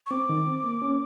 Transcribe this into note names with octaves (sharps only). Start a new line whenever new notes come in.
C#6
C4 D6
D#3
C4
A#3
C#4